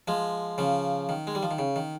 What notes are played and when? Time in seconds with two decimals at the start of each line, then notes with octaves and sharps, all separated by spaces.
0.08 F3 G#3
0.58 C#3 F3
1.09 D#3
1.27 G#3
1.35 G3
1.43 F3
1.51 D#3
1.59 C#3
1.76 D#3